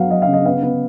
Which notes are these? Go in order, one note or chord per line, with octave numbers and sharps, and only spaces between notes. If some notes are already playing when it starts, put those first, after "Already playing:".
Already playing: F#3 B3 F5 F#5
F#3 D#5
F5
C#3
D#5
B3 F5
B3